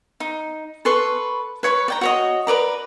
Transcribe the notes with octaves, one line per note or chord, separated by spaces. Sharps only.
D#4
A4 B4 C6 C#6
B4 C#5 B5 C#6
D5 G5 A#5
F#4 C#5 D#5
A#4 B4 D5 A#5